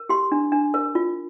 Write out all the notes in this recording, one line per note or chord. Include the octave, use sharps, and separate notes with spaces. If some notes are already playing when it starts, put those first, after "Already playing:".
Already playing: A#4
G4 C6
D4
D4
A#4
F4